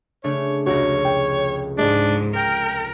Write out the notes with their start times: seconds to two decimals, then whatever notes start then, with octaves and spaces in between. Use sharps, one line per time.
0.24 C#3 A3 D4 C#5
0.67 F1 C#2 F#4 C#5 A#6
1.05 G5
1.78 G#2 G#3 D4
2.36 A#4 G5